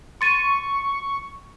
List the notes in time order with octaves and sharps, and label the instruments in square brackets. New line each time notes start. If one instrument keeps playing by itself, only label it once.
[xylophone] C6 A6 D#7 [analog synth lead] C#6